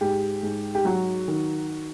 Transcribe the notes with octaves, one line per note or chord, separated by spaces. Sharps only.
G#2 G4
G#2
G4
F#3 F#4
D#3